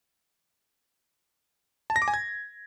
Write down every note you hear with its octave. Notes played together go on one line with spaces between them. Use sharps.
A5
A#6
D6
G#5
G#6